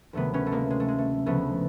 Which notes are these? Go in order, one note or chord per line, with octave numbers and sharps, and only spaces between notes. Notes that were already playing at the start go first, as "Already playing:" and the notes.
D2 C3 D#3 F#3 A3 B3
B3 C#4
A3
G#3 A#3
G#3
A3
G#3
A3
D2 C#3 F3 A3 B3